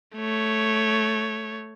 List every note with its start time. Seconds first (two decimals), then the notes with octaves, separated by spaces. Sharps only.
0.16 A3 C#5